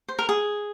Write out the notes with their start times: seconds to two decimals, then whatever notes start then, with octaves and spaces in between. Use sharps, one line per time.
0.08 C5
0.19 A#4
0.29 G#4